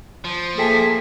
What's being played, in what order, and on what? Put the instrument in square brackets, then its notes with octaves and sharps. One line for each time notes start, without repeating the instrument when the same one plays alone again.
[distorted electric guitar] F3
[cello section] A#3 [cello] G#4 E5 [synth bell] A4 G5 A5